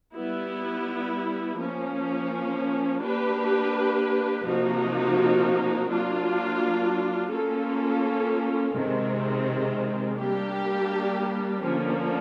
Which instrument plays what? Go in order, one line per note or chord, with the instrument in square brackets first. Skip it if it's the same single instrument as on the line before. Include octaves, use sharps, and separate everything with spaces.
[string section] G3 B3 E4
F3 A#3 C#4
A#3 D4 G4 B4
C3 F3 A#3 D#4 F#4
F#3 A#3 D4 F4
A#3 C#4 F4 A4
C3 D#3 G#3 C4
G3 A#3 D4 G4
D3 F3 A#3 C#4